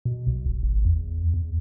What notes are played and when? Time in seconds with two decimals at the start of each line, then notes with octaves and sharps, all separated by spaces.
0.05 B2
0.27 B1
0.46 D#1
0.63 G#1
0.85 E2
1.34 E2